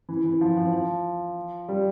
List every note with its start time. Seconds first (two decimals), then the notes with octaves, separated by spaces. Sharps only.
0.09 E3
0.25 E3
0.41 F3
0.57 F3
0.73 F3
1.68 G3